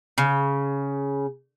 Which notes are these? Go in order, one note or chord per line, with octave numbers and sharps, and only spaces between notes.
C#3